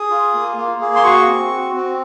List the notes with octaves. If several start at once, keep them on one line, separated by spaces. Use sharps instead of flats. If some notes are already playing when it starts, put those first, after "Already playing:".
Already playing: G#4 D#6
F4
A#3
A#3
G#4
C6
F#4 C#6
C4
F#4
C4